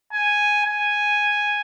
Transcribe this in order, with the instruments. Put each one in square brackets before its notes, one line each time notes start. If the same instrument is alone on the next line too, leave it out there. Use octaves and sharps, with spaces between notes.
[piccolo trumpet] G#5
G#5